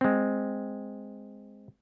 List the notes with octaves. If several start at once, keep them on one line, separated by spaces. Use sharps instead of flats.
G#3 C4